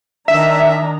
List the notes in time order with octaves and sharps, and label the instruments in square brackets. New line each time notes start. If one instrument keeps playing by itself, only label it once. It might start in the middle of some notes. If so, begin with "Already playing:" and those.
[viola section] D#3 D4 A#5 [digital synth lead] E5